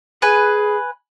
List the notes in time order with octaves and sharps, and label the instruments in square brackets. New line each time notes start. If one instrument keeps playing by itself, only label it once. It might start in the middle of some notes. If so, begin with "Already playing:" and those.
[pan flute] G#4 [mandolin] B4 G#5